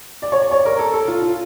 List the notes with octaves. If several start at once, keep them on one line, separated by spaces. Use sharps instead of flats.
D5
C#5
D5
C#5
A#4
A4
A4
F4
F4